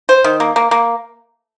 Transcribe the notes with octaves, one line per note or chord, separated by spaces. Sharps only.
C5
D#3
A#3
A#3
A#3